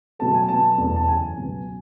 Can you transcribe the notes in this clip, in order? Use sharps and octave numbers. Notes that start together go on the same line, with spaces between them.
B2 F#3 A3 A5
G#5
B2 F#3 B3 A5
E2 B2 A3
A5
F#2 C#3 E3 G#5
C#2 B2 F#3 B3